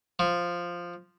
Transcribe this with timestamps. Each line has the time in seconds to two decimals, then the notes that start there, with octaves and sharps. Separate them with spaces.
0.19 F3